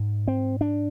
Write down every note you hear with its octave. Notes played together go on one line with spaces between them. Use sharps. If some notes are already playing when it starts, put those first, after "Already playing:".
Already playing: G#2
C4
D4